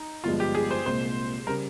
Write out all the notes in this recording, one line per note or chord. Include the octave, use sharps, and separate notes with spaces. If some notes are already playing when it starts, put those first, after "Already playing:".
Already playing: D#4
G1 G2 F3 G#3 F4
G4
G#4
C5
C2 A#2 G#3 C5
C#3 G3 A#4